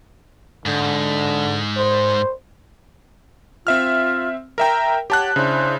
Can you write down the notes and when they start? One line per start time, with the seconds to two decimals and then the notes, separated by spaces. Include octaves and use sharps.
0.66 G#2 D3
1.77 C5
3.67 C4 F4 E5 F6
4.58 A#4 E5 G5 A#5
5.10 G4 C#5 F#5 A5 F#6
5.36 C#3 D4 E4 C5